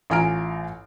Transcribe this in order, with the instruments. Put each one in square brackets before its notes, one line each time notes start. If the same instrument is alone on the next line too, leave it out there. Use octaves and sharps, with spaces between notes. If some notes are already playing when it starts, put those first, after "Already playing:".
[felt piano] A1 F4 G#5 A#5 F6 D7